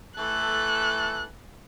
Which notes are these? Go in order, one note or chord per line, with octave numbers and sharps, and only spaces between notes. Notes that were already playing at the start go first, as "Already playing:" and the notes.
E3 A3 A4 F#6